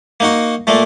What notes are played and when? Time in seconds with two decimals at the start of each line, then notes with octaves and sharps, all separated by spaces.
0.20 A#3 D#4 F#4
0.67 A#2 A3 A#3